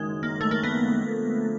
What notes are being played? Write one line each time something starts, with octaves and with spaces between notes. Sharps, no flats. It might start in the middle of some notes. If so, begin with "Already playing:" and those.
Already playing: F#1 F#2 D#3 G#3
A#3
A3
A#3
B3
D3 F3 A3